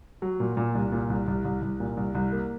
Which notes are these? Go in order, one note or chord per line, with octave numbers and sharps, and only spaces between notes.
F#3
A#2
A#2
C2
A#2
C2
C2
C2
C2
A#2
C2
C2
A#3